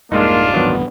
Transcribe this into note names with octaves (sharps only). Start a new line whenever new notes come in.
F1 C2 G#2 G#3 A#3 D4 D#4 F4
D#1 A1 G2 D#3 F#3 B3